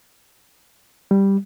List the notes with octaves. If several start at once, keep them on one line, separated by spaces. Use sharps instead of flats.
G3